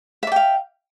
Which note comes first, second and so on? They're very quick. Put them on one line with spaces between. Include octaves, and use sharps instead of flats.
E5 D5 G5 F5